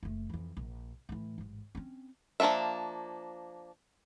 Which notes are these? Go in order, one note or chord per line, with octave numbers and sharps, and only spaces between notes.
F#1 A3
F2 E3
A#1
A2 E3
A1 G#2
C4 C#4
F3 A#3 C#4 D4 E5